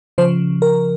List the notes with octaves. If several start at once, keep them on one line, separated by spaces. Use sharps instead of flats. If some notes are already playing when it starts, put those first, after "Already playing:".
C#3 F3 C5
A#4